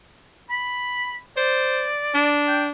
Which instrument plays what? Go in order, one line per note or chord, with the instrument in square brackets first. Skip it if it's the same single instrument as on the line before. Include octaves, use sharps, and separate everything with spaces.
[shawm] B5
[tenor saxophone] C5 [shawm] D5
[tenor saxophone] D4
[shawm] G5